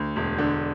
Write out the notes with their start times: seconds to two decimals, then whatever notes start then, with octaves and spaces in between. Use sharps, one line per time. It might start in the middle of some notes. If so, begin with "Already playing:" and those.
Already playing: D2
0.16 E1
0.38 D3